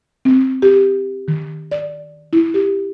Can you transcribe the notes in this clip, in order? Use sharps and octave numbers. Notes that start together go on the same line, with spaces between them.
C4
G4
D#3
D5
E4
G4